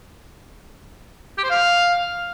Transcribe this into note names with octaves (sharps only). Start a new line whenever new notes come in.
G4
C5
F5